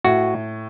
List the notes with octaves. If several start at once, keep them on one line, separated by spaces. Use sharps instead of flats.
A2 F#4